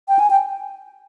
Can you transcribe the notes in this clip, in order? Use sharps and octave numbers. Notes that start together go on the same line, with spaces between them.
G5
G#5
G5